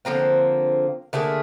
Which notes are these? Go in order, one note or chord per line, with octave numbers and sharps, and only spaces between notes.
D3 F3 A#3 C4
D3 A3 A#3 G#4